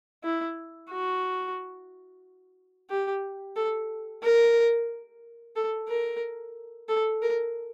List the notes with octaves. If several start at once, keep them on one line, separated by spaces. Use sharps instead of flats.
E4
F#4
G4
A4
A#4
A4
A#4
A4
A#4